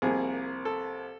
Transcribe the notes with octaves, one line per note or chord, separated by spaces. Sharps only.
C2 C3 F3 A#3 G#4
A4